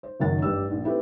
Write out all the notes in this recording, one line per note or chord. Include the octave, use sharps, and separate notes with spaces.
C5
F#1 F#2 D#3 F#5 A6
A1 G2 G4 E6
A#1
A3 C4 E4 G4 B4